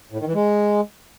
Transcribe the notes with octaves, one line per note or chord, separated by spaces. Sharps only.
A2
D#3
E3
G#3